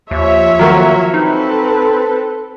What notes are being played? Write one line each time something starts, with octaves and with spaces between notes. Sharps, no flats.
D#2 F3 C#5 E5
D#3 F#3 A#3 F#4
C4 D#4 A4 B4